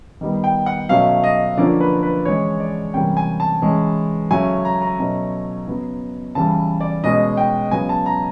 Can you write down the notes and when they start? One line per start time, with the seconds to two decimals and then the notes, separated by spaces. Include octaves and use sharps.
0.21 D#3 G3 B3
0.44 G5
0.66 F#5
0.89 B2 F#3 A3 C#4 F5
1.24 D#5
1.57 D3 F3 A#3 C#4 D5
1.81 B4
2.03 B4
2.25 E3 G#3 C#4 C#5
2.60 D5
2.94 C3 E3 G3 A#3 C#4 G5
3.17 G#5
3.40 A5
3.62 E3 G#3 C#4
4.31 C#3 F#3 A3 C#4 G#5
4.65 A#5
4.82 A#5
4.99 B2 F#3 A3 C#4
5.67 C#3 F#3 B3
6.35 C#3 E3 G3 A5
6.81 D5
7.04 B2 G#3 C#4 D#5
7.37 G5
7.71 C#3 F#3 B3 G#5
7.89 A5
8.06 A#5